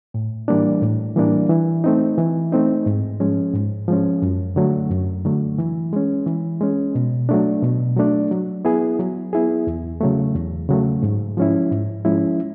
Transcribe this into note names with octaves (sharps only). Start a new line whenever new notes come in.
A2
E3 G3 A#3 D4
A2
E3 G3 A#3 D4
E3
A3 C4 D#4
E3
A3 C4 D#4
G#2
F3 G#3 C#4
G#2
F3 G#3 C#4
F#2
D3 F#3 A3
F#2
D3 F#3 A3
E3
G#3 C#4
E3
G#3 C#4
B2
F#3 A3 D4
B2
F#3 A3 D4
F#3
B3 E4 G#4
F#3
B3 E4 G#4
E2
C#3 F#3 A3
E2
C#3 F#3 A3
G#2
F3 G#3 C#4 E4
G#2
F3 G#3 C#4 E4